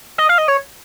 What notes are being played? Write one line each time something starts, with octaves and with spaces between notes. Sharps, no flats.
D#5
F5
D#5
C#5